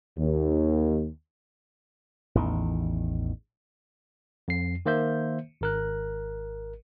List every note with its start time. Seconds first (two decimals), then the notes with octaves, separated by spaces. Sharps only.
0.18 D#2
2.35 A1 E2 D#3
4.48 F2 C7
4.86 D#3 A#3 C5 E5 G6
5.61 G#1 A#4 F#6